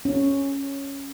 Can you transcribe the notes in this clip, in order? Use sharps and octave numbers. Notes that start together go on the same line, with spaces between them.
C#4